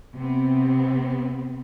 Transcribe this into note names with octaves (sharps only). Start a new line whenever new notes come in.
C3 B3 C4